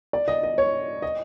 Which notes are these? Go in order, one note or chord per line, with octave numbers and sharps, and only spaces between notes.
D5
D#5
D#5
C#5
D#5